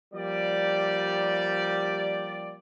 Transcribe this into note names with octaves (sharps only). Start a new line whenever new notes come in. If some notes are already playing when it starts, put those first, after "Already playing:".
F3 G3 A#3 G4 D5